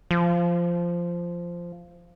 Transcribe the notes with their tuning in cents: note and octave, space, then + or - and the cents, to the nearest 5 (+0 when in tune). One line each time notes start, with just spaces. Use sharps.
F3 -10